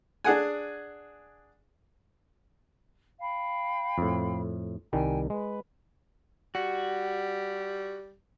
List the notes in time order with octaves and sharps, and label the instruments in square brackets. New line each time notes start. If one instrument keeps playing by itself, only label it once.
[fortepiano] D4 G#4 F#5 G#5
[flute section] F5 G5 B5
[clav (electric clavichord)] F2 A2
[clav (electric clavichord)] C2 D#3 G3 [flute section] G5 G#5
[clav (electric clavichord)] G#3 [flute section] B4
[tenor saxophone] G3 [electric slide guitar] F#4